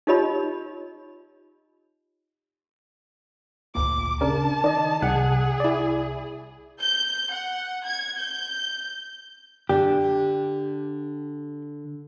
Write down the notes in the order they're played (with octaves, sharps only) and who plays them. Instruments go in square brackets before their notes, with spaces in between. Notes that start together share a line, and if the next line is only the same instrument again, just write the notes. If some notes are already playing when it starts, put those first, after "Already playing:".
[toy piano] D#4 F4 G4 C#5 D#5 B5
[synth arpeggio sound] G#1 D2 A#2 [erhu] D6
[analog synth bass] C#3 [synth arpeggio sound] D4 A#4 [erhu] A5
[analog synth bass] D#3 [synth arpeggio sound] D5 D#5
[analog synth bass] C2 [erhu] G#4 [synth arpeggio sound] F#5
[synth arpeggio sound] E4 D5
[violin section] G6
F#5
G#6
G6
[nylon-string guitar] D3 D4 [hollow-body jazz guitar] G4